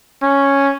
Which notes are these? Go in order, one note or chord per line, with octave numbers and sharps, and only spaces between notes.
C#4